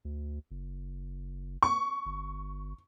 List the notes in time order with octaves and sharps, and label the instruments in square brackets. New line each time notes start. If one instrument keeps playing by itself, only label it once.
[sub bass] D2
F#1
[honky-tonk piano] C#6
[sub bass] G1